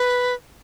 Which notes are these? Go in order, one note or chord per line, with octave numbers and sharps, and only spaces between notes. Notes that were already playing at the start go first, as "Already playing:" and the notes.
Already playing: B4